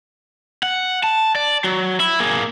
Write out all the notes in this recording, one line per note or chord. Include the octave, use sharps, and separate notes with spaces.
F#5
A5
D5
F#3
E4
A#3 G#4